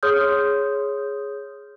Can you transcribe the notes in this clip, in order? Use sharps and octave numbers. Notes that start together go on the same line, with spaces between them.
G#4 C#5 C6 D#6 F6 G6